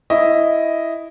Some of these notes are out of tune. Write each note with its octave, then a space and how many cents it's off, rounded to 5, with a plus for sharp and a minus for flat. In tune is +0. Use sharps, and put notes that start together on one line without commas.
E4 +0 D#5 +0